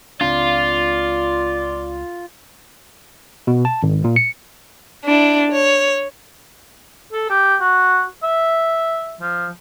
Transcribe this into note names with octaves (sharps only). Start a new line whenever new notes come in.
C#2 C4 D4 F4 D5
B2
A5
G#1
A#2
C#7
D4 E4
C#5
A4
G4
F#4
E5
F3